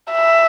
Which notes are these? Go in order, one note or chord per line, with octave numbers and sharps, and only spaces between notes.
E5